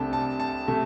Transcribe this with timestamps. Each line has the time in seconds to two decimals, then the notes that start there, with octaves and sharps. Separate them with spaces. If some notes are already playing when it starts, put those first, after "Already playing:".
Already playing: C2 C3 A3 D4 G5 A5
0.13 A5
0.40 A5
0.68 C3 A3